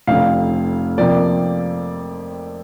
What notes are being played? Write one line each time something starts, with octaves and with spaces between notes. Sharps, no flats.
F1 F2 D3 F5
F2 C3 F3 A#3 D5